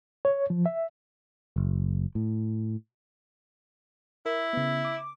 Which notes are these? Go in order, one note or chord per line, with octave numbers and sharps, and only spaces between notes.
C#5
F3
E5
F#1
A2
E4 A#4
C#3 B3
D6